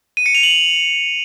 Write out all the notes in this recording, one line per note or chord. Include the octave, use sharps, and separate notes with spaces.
D#7
C#7
F7
F#7